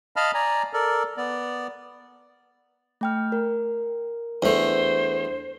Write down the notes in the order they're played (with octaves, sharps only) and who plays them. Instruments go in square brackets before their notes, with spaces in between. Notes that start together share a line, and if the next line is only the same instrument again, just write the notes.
[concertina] D#5 F5 A5 B5 F6
D5 G#5 A#5
A4 A#4 D5
B3 D5
[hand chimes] A3 G5 F6
A#4
[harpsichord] E2 A3 [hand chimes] D4 [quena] C5